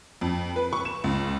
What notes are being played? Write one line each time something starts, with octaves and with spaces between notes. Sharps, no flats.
F2
B4
C#6
E7
C#2